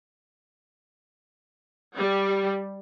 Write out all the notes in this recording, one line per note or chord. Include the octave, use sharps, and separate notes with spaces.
G3